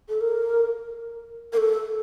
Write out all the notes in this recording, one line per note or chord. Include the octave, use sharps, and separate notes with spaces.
A4
A#4
A#4
A4